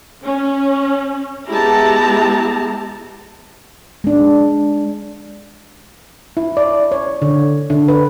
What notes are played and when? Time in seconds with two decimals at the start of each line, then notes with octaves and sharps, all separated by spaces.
0.24 C#4
1.49 G#3 B3 E4 G4 A5 A#5
4.04 G#3 D4
6.37 E4
6.57 D5
6.92 C#5
7.22 D3
7.70 D3
7.88 B4